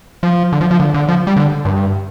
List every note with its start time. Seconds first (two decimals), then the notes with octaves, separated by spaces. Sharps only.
0.23 F3
0.52 D3
0.61 F3
0.71 F3
0.80 D3
0.94 D3
1.08 F3
1.27 G3
1.36 D3
1.65 G2